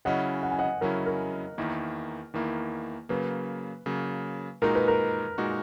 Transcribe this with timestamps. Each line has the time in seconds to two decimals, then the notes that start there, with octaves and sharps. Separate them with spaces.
0.05 C#3 F#3 C#4 E4 D#5 F#5
0.43 F#5
0.51 G#5
0.59 D#5 F#5
0.81 C#3 F#3 C#4 E4 A#4
1.06 A#4
1.58 E2 D#3 A#3 E4
2.34 E2 D#3 A#3 E4
3.09 C#3 F#3 A#3 B4
3.86 C#3 F#3 A#3
4.62 A#2 G#3 D#4 F#4 A#4
4.75 B4
4.88 A#4
5.38 A#2 G#3 D#4 F#4